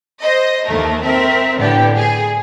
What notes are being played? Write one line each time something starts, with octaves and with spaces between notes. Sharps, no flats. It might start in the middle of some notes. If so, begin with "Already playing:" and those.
C5 D#5
D#2 A3 A#4
C4 A#4 E5
A2 D3 B3 G4
G#4